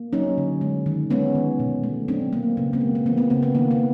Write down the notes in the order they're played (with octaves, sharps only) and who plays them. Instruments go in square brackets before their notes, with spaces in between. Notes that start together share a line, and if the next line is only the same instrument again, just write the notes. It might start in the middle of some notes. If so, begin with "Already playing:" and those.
Already playing: [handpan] A#3
F#3 C#4 D#4
D3
G#3
D#3
G#3 B3 C#4
D#3
B2
A3
F#3 C4 D4
B2 A#3
C#3 B3
A#3 C4
G#3
B3
E3 A#3 C4
B3
C#3 A#3 C4
B3
D#3 A#3
B3
A#3